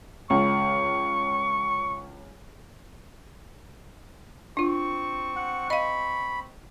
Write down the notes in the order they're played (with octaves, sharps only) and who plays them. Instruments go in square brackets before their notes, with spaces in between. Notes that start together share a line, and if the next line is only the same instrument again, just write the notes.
[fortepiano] C#2 [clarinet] C#6
[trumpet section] C4 C#6 [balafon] D4 F4
[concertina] F#5
[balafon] D#5 F5 [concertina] B5